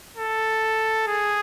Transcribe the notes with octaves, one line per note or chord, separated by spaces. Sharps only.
A4
G#4